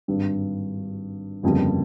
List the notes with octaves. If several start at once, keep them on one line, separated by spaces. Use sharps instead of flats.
G#1 G2 G3
G1 F2 C#3 G3 A#3